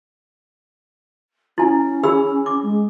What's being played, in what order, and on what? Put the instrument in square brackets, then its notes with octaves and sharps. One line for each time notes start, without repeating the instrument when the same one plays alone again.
[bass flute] C#4 [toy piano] E4 G#5
[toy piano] G#4 B5 E6
D6
[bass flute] G#3